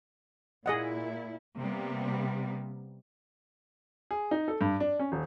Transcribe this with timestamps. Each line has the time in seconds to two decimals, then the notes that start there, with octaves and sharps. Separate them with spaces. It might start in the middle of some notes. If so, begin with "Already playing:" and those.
0.66 A#2 E4 G#4 D#5 F#5
1.57 C3 G3 A#3 B3
4.11 G#4
4.31 D#4
4.48 A4
4.61 G2
4.80 D4
5.00 C#4
5.12 D#1